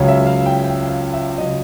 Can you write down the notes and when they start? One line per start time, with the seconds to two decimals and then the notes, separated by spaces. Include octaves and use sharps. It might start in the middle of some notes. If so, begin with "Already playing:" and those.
Already playing: C#2 C#3 F#3 C#5
0.08 E5
0.27 F5
0.46 G5
0.64 G5
0.88 F5
1.13 E5
1.38 C#3 F#3 D#5